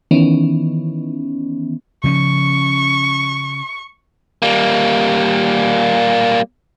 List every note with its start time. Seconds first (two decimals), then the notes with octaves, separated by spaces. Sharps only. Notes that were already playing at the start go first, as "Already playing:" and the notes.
0.11 D#3 E3 B3 C#4
2.04 C#3 F3 C#4 C#6
4.42 G3 A#3